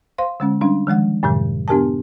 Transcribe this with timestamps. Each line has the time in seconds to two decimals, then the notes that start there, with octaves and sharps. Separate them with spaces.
0.18 C5 F5 C6
0.40 D3 G#3 C#4
0.61 G3 C#4 D4
0.87 D#3 F3 G#3 F#5
1.23 F#2 A2 C3 D#3 F#3
1.68 B3 D4 G4 A#4 G#5 A5